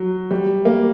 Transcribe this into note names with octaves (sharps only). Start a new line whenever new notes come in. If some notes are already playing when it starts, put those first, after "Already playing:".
Already playing: F#3
G3
A#3